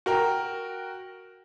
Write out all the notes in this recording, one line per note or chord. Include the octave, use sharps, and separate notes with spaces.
F#4 A#4 G5